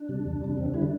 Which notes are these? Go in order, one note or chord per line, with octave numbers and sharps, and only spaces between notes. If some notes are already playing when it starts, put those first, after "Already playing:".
Already playing: D4
C3 G3
E2
C3 G3
E2 C4
D4
D3 G3 E4
D4